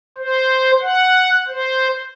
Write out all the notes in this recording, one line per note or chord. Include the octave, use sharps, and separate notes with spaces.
C5
F#5
C5